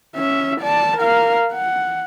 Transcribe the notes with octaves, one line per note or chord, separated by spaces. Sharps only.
C#4 E5
D5 A5
A#4 F5
F#5